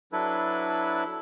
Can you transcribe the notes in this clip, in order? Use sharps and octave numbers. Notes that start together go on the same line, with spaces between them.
F#3 D4 E4 A4 B4